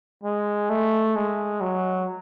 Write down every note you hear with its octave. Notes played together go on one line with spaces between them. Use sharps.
G#3
A3
G#3
F#3